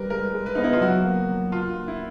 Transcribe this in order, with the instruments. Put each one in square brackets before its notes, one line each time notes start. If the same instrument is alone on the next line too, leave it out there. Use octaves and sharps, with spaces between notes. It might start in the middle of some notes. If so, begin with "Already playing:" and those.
Already playing: [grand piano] G3 [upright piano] A#4 B4
[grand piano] G#3 [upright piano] A#4
[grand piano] G#3
[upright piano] B4
[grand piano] B3 [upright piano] D#4
[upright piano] E4
F4
[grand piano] F#3 [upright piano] F#4
[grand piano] A#3
F#3
[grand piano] A#3 [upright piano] F4
[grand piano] A#3
[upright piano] E4